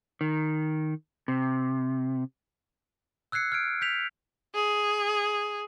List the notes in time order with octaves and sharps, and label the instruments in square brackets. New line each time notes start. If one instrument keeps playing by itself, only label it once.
[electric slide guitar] D#3
C3
[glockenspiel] E6 F#6 G#6 C7 C#7
F6 G#6 D7
G6 B6 F7
[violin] G#4